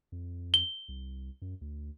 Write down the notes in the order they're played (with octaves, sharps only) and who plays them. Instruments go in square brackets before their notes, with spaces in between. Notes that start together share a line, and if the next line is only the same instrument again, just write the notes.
[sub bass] F2
[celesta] G7
[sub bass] C2
F#2
D2